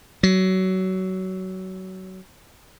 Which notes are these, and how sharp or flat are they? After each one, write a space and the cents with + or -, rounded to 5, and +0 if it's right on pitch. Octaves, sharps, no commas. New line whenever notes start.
F#3 +20